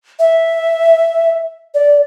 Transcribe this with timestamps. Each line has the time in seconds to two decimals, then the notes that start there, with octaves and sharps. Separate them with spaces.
0.19 E5
1.74 D5